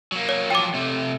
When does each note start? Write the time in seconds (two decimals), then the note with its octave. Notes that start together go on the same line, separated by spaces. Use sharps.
0.12 F#3 A#3
0.29 C#5
0.50 F3 F#3 G5 D6
0.74 C3 A3